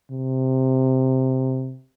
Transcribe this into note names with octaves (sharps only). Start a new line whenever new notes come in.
C3